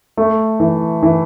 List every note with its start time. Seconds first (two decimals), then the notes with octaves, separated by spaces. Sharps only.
0.17 A3
0.60 E3
1.03 E3